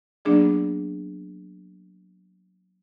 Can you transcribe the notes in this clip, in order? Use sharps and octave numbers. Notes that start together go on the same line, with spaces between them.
F#3 A#3 B3 D4 G#4 D5